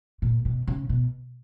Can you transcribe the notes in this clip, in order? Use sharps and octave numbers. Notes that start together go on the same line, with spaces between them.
A#2
B2
C#3
B2